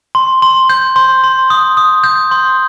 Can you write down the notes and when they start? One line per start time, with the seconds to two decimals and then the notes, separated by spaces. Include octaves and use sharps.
0.15 C6
0.42 C6
0.70 G6
0.96 C6
1.24 C6
1.50 D#6
1.77 D#6
2.04 G6
2.31 C6